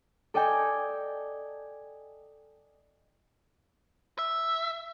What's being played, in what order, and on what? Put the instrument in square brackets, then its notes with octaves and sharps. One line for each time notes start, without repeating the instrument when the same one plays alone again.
[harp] A4 D5 D#5 G5 G#5
[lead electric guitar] E5